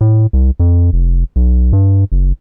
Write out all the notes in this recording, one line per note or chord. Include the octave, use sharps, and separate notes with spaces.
A2
C2
F2
F1
B1
G2
F#1